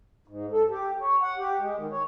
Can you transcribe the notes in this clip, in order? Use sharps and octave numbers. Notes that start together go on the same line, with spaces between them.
G#2
A4
G4
C#5
F#5
G4
G#3
D#3
C#5